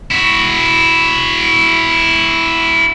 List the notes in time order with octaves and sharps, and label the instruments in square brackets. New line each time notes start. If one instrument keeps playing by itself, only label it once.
[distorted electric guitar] E4 F#4